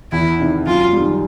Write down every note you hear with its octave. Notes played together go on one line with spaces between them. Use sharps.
E2 E4
C3 D#3
F#2 F4
G3
D#3